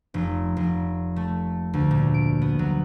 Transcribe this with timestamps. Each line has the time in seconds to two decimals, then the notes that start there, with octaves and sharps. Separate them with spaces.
0.14 F1
0.57 F1
1.16 A3
1.73 D2
1.91 A#2
2.14 D7
2.41 B3
2.59 F#3